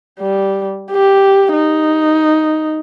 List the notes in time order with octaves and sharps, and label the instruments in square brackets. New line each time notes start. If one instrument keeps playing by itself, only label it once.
[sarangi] G3
G4
D#4